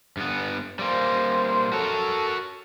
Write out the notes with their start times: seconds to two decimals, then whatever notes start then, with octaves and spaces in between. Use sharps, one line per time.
0.17 G2 B3
0.79 G3 A#3 C5
1.72 F#4 A4 A#4 C#5